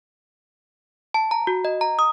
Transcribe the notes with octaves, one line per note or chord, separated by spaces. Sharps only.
A5
A#5
F#4
D#5
A#5
D#6